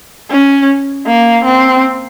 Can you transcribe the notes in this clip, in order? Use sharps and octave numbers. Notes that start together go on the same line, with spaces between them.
C#4
A#3
C4